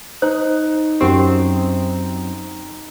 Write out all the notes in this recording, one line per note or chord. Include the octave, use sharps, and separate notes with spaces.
D#4 C5
F#2 C4 F#4 G4